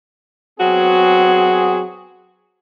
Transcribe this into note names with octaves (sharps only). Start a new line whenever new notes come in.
F#3 B3 C4 F#4 G#4